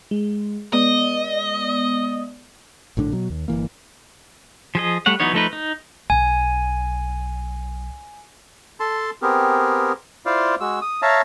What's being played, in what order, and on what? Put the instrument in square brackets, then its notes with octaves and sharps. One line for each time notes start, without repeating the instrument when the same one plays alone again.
[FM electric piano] G#3
[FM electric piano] G#3 B3 D5 [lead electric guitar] D#5
[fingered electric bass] A#1 A2 D3 D4
B2 F#3
D#2
G1 D#2 E3 A#3
[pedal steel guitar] F3 G#4 D#5
G3 A3 C#5 F#5
E3 F#3 B3 D#4 C#5
F3 A3 D#4 B4
D#4
[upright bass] B1 [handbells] G#5
[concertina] A4 A5 C6
B3 C4 G4 G#4 A#4
E4 F4 C5 D5 F5
G#3 F#4 E6
D#6
C#5 E5 F5 A5 A#5